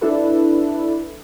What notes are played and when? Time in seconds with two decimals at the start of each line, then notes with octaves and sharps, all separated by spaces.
0.01 D4 E4 A4 B4